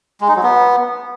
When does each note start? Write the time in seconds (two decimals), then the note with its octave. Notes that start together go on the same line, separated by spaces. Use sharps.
0.21 G#3
0.28 D#4
0.36 F#3
0.43 B3